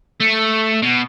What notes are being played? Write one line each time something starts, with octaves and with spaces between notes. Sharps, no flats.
A3
B2